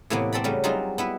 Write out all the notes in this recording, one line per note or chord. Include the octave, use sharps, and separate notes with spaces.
A2 C3 E3 A#3 B3
C4 A4 D5 B5
C#3 F#3 G3 A3 C#4
F#3 G3 C4 D#4 F4 G#4
B3 E4 B4